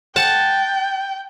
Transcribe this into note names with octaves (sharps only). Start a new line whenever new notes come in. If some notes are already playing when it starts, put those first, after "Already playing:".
F#5 G5 A5